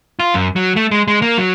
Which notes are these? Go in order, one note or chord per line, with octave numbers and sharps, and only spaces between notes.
F4
F#2
F#3
A3
G#3
G#3
A#3
F#3